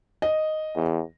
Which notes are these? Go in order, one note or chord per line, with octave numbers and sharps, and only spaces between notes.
D#5
E2